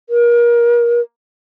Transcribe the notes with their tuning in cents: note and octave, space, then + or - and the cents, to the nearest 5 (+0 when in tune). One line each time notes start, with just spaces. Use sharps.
A#4 +30